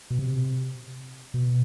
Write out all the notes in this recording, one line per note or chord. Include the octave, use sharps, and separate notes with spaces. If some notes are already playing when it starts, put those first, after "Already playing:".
B2
C3
B2